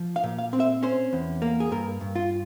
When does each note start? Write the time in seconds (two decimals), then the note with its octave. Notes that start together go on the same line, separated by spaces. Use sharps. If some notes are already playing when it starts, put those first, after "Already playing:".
Already playing: F3
0.16 F5
0.23 A#2
0.38 F5
0.53 C4
0.60 E5
0.83 C#4 C5
1.13 E2
1.42 A#3
1.60 G#4
1.71 G2 A#4
2.01 G2
2.15 F4